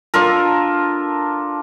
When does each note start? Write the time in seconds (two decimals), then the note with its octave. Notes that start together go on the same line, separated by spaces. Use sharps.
0.14 D4 F4 A4 A#4